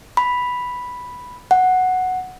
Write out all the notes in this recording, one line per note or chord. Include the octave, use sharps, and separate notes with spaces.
B5
F#5